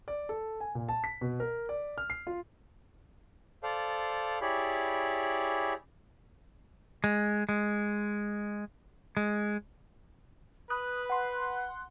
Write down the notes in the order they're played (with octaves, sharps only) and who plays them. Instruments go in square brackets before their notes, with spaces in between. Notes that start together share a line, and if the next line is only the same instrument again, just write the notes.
[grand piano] D5
A4
G#5
A#2
A5
B6
B2
A#4
D5
F6
C7
F4
[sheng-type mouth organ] A4 C5 D5 F5
E4 G4 G#4 C#5 D5 B5
[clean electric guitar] G#3
G#3
G#3
[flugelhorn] B4 [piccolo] B5 [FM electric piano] D#6 F#6
[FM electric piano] F#5 C6 [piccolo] F#6